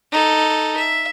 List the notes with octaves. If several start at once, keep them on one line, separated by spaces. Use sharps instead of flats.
D#4 A4
E5